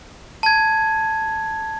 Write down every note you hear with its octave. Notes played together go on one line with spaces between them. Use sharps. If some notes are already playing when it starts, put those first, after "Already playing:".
A5 G#6